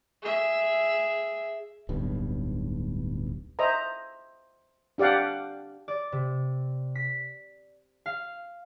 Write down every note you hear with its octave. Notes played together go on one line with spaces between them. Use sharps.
G#4 E5
D1 B1 G2
C5 D#5 E5 A#5
D4 G4 D5 F5 F#5
D5
C3
B6
F5